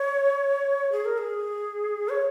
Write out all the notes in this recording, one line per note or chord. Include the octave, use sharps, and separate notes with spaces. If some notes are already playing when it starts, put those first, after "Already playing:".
Already playing: C#5
G#4
A#4
G#4
C#5